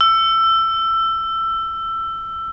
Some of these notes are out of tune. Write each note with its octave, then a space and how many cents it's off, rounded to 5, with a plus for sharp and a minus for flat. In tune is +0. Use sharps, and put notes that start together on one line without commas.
E6 +20